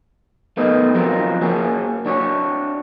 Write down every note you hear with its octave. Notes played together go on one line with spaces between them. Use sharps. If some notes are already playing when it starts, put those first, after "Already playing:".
A3 B3 D#4 A#4 D#5
F3 F#3 C4 F4 F#4 A#4
A#3 C#4 F#4 G#4
D4 F#4 C#5